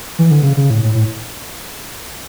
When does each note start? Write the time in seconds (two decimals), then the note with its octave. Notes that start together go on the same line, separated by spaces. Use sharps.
0.19 E3
0.31 D3
0.42 C#3
0.57 C#3
0.70 A2
0.84 A2
0.95 A2